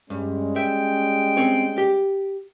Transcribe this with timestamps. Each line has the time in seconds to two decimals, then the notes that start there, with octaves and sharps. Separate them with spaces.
0.10 G2 G3 G#3 C#4
0.56 E5 G5
1.37 C4 C#5
1.78 G4